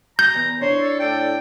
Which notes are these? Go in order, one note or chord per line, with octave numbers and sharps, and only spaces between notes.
A#5 G6
E2
D4 E4 C5 C#5
A4
A2 A4 D5 G5